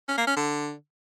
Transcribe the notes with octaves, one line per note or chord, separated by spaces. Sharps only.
C#4
A#3
C#4
D3